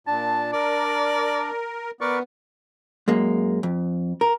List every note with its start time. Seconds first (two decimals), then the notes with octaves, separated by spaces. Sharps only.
0.07 A#2 D4 A5
0.53 A#4 D5
2.01 B3 A#4 B4 D5 C#6
3.08 F#2 G#3 A#3
3.63 F2
4.21 A#4